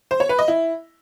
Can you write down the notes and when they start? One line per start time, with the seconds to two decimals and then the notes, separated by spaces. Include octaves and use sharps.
0.11 C5
0.20 C#5
0.29 B4
0.39 D#5
0.48 E4